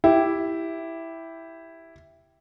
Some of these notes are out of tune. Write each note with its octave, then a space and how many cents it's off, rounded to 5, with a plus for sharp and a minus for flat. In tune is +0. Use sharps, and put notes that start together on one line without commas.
E4 +0 G4 +0